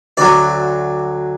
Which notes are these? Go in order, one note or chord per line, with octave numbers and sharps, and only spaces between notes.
D2 D3 F#3 D5